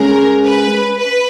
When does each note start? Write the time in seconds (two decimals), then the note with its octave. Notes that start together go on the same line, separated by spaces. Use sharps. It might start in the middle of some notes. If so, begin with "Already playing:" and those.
Already playing: G#3 C#4 G#4 A#4
0.45 B4
0.99 B4